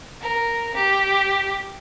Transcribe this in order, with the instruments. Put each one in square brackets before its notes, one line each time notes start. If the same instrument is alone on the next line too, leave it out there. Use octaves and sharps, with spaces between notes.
[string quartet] A#4
G4